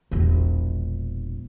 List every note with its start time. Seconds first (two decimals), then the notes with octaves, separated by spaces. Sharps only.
0.11 E1 A#1